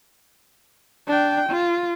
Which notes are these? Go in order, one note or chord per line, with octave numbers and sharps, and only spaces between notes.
D4 G5
F4